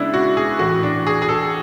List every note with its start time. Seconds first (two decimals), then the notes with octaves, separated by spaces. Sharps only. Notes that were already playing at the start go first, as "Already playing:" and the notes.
Already playing: C#3 G#3 B3 D4 E4
0.14 F#4
0.37 G#4
0.59 A2 E3 A3 F#4
0.83 D4
1.07 G#4
1.22 G#4
1.29 A4